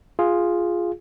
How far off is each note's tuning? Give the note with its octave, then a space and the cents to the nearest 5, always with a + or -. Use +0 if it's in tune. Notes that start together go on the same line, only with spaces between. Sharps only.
F4 +0 G#4 -5